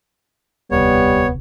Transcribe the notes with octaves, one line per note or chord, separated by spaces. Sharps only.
E1 D2 C3 G3 B3 C#5